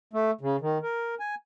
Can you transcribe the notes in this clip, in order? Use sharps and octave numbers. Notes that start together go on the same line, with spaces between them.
A3
C#3
D#3
A#4
G#5